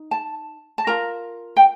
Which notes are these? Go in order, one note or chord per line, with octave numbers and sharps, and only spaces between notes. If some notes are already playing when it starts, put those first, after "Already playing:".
Already playing: D#4
A5
A5
F4 A#4 A#5
G5